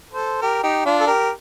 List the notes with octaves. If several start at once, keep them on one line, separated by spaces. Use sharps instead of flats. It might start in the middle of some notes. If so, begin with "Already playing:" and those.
A4 C5
G4 A#4
D#4 G4
D4 F4
A4
G4 A#4